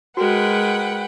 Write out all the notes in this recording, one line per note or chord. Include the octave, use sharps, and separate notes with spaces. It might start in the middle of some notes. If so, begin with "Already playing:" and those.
G#3 F#4 A#4 B4 F#5 G5